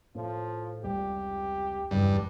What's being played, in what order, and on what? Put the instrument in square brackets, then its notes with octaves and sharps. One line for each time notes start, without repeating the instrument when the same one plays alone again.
[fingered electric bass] A2 [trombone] F3
[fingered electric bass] F1 C#2 G3 [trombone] G4
[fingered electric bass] F#1 E2 C#3 [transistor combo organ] G2